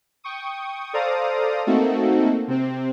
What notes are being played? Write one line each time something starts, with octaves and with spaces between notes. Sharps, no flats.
G5 C#6 D#6
A4 C5 D5 F5 A#5 D#6
A3 A#3 C4 D#4 F#4 A4
C3 C4